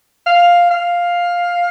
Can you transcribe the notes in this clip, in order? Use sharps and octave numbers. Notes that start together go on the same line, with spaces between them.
F5
F5